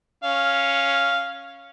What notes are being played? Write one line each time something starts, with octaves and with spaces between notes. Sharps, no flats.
C#4 F5